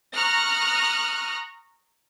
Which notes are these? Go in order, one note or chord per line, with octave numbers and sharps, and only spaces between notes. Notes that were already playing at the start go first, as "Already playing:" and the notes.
A#5 C#6 D#6 F6 F#6 A#6